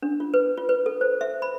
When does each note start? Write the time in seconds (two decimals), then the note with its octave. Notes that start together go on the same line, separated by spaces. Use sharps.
0.02 D4
0.20 F4
0.34 B4
0.57 F4
0.69 B4
0.86 A4
1.01 C5
1.21 E5
1.42 B5